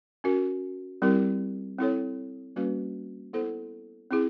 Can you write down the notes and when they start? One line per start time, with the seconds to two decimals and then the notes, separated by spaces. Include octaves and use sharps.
0.24 C#4 F#4 A#4
1.02 G3 C4 E4 G4 A#4
1.79 C4 E4 A4 C#5
2.56 G3 A#3 C#4 F#4 B4
3.33 B3 E4 A4 C5
4.11 C4 E4 G#4